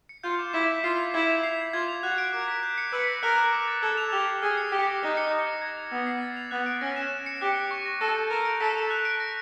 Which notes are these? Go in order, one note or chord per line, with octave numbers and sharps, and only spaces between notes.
C#7
F4 G6
D6
E4 D6
B6
F4 C7
G#6
E4 G#6
F7
C7
G#6
F4 G#6
F7
F#4 F#6
D7
A#4 D6
B6
G6
C#7
B4 E6
A#6
A#4 F#6
D6
D6
A6
A4 G#6
F7
G4 F6
C7
G#4 F6
C#7
G4 D6
A#6
D#4 F#6
C#7
D6
A#6
G#6
F7
B3 E6
C7
A6
F7
B3 F#6
D7
C#4 A#6
E7
F#6
C#7
G4 F#6
C#7
C#6
A#6
A4 A#6
G6
A#4 G6
D7
A4 B6
F7
F#6
D7
A#6